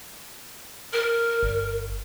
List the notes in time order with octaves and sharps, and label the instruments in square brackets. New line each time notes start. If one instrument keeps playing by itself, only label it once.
[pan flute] A#4
[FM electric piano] G1